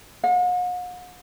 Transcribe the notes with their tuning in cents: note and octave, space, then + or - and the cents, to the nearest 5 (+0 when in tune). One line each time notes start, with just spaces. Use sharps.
F#5 -45